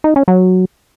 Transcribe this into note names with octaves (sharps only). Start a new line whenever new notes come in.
D#4
C#4
F#3